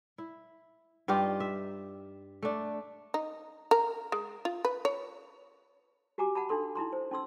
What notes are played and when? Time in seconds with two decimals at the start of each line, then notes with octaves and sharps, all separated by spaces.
0.18 E4
1.08 G2 D#4 F4 G4
1.40 E5
2.43 A3 D4
3.14 D#4
3.71 A#4
4.12 G#3
4.45 F4
4.65 B4
4.85 C#5
6.18 F#4 G4 G#5 A#5 D6
6.35 F#5 A5 B5
6.49 D4 D#4 A4 C6
6.75 D#4 E4 A#5 C6
6.93 C5
7.11 C#4 D#4 C6 E6